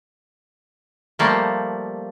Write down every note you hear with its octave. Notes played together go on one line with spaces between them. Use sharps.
F3 G3 A3 A#3